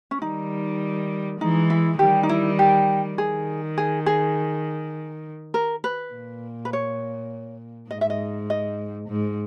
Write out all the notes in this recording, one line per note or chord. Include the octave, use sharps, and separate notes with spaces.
C#4
D#3 G3 D#4
E3 G#3 D#4
E4
D#3 G3 G4
D#4
E4
G4
D#3 G#4
G#4
G#4
A#4
B4
A#2
B4
C#5
G#2 D#5
E5
D#5
D#5
G#2